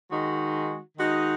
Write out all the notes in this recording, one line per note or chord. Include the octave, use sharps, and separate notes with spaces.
D#3 G#3 D#4 F#4
D#3 G#3 D#4 F#4